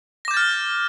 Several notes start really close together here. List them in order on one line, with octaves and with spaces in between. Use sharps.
A#6 D6 G6 A6 F6